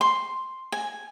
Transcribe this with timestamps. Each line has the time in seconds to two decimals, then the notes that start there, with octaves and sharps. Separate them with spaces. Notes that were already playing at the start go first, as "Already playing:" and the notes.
0.01 C6
0.72 G#5